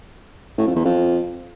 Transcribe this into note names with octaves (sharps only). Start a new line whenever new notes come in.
A2
F2
E2
F2